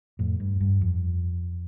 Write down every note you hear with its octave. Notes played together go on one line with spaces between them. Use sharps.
F2 A2
G2
G2
F2